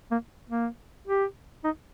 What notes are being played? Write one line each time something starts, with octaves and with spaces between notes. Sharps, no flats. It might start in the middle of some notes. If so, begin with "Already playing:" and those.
A#3
A#3
G4
D#4